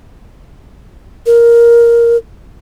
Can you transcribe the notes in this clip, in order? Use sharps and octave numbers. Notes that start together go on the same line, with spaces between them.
A#4